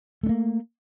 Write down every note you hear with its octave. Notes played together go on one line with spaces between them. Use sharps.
A3 A#3 D4